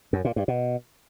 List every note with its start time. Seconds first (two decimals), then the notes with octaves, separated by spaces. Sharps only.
0.13 F#2
0.25 A#2
0.36 G2
0.48 B2